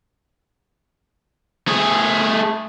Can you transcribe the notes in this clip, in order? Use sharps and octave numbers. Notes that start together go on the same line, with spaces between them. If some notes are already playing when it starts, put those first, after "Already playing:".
A3 G#4